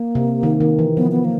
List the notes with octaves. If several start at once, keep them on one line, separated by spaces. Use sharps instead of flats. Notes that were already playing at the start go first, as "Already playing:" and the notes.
Already playing: A#3
C3
D#3
D#3
E3
F3 B3
B3
A#3